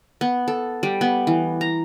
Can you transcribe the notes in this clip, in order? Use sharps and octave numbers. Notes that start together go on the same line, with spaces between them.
B3
A4
G3
B3
E3
A#5